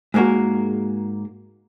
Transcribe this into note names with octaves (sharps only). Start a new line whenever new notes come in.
G#2 G#3 A#3 F#4 A#4